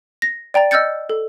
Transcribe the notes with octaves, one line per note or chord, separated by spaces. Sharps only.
A#6
D5 G5 A#5 A6
D#5 E6 F6 G6 A6 C#7
A4